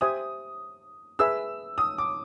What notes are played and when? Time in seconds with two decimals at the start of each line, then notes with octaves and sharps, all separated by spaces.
0.01 G4 C5 E5 G#5 D#6
1.19 G#4 B4 E5 E6
1.78 D#6
1.98 D6